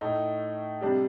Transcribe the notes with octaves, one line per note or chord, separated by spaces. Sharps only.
A2 A3 D#4
C3 G3 D4 G4